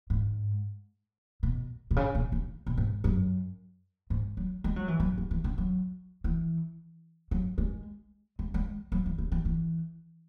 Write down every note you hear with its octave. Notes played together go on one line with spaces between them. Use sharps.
G#2
B2
B2
C#3
B2
C#3
B2
G#2
F#2
G#2
F#3
G#3
F#3
E3
F#3
F#3
E3
C#3
F#3
E3
F#3
G#3
G#3
G#3
F#3
E3
C#3
E3
E3